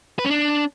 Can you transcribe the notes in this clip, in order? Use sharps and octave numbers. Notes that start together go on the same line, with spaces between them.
B4
C#4
D4